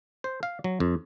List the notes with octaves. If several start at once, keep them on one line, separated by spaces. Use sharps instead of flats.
C5
F5
F#3
F2